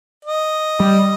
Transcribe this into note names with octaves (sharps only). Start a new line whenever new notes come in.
D#5
G3